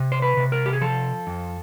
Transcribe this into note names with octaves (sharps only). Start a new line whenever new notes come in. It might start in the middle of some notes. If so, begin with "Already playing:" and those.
Already playing: C3
C5
B4
C3
A#4
G4
G#4
F3 A4
F2